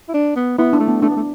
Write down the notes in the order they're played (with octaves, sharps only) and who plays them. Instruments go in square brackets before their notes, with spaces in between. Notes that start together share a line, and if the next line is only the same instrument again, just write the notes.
[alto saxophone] E4
D4
B3
[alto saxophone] B3 [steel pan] E4
[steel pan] D4
[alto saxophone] A3
[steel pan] B3
[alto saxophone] A3 [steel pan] D4
[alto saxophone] B3
A3